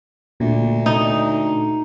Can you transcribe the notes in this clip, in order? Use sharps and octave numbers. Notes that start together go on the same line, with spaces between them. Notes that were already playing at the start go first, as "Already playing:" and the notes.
D2 A#2
D#4